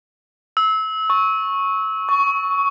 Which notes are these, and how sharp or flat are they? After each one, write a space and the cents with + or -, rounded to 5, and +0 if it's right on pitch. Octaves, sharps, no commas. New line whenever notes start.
E6 -25
C#6 -10
C#6 +10